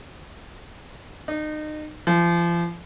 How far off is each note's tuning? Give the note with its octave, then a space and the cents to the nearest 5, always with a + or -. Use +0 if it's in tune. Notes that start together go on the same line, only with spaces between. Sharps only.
D#4 -30
F3 -35